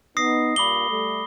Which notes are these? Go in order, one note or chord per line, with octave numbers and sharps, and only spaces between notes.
B3 D#4 D#6 A#6 C7
G2 A#2 B5 D6 G7
G3 A3